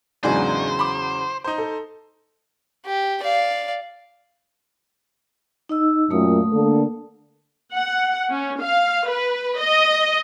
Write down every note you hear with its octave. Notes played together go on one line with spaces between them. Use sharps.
E2 G#2 C#3 F#3 D4 C5 G#5
B5 D6
D#4 C5
A4
G4
D5 F5
D#4 D#5 E6
F#2 A#2 A3 D#6
D3 A#3 A4
F#5
C#4
F5
B4
D#5